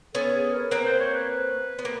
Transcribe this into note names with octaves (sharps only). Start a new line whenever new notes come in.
B3 C#4 A4
G#4
A#4
A#3 C4 B4
C5
C#5
B4
B3
A#3